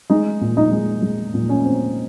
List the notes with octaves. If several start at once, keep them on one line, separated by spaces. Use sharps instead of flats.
G#3 D#4
A#2
D#4
G#3
G#3
A#2
C#4
C4